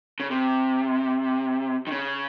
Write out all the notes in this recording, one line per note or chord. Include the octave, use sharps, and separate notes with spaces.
C#3
C3
D#3
C#3